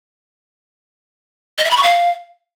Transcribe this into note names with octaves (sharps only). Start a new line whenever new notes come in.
D#5
E5
B5
C#6
F5